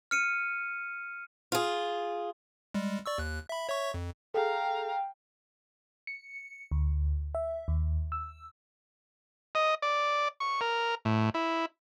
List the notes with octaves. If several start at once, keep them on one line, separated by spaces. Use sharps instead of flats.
F6 C#7 D#7
F4 G#4
G3 G#3
D5 C#6 E6
D#2 F#6
E5 B5
C#5 E5 C#6
F2
G#4 A4 F5 G5 A#5
C#7
D2
E5
D#2
E6
D#5
D5
C#6
A#4
A2
E4